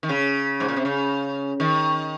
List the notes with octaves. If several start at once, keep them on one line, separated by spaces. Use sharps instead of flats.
D#3
C#3
G#2
A#2
C3
C#3
D#3